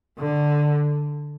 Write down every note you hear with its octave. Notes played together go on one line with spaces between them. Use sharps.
D3